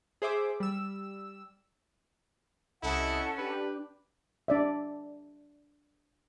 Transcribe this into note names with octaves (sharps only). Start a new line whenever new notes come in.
G#4 C5 E5 D6
G3 E6
C2 C#4 E4 A4 D#5 F#5
D4 G4 B4
D4 D5 E5